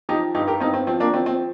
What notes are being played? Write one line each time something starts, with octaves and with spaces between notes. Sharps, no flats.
F3 D#4 G4
G2 D#4 G4
G4 A#4
G2 C4 D#4
C4
F3 C4
A#3 D4
F3 C4
C4